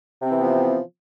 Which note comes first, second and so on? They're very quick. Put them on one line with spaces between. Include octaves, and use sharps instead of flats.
C3 C4 E3 B3 F3